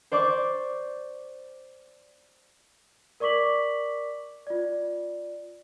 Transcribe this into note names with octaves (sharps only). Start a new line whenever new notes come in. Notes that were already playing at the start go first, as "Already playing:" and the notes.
C5 D5 C#6 D6
A#4 D5 C#6 D6 B6 F#7
F4 D5